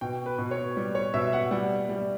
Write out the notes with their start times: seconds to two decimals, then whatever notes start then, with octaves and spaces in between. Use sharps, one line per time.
0.01 B2 G5
0.26 B4
0.38 B2
0.51 C#5
0.77 G3
0.95 C#5
1.14 B2 E5
1.33 F#5
1.51 G3 F#5
1.89 G3